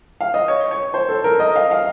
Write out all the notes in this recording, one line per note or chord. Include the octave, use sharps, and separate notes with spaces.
F5
D#5
C#5
C#5
C5
A4
A#4
D#5
F5
F5